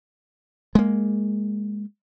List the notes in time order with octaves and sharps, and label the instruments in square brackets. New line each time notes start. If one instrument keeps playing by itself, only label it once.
[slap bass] G#3 A#3